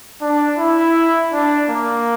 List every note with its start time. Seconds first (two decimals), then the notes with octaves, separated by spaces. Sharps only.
0.22 D4
0.58 E4
1.33 D4
1.69 A#3